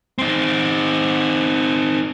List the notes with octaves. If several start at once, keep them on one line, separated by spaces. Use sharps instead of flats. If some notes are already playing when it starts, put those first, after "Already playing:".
C4 D#4